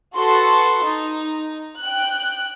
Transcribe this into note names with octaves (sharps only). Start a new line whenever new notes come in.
F#4 A4 B4 A5 C6
D#4
G5 F#6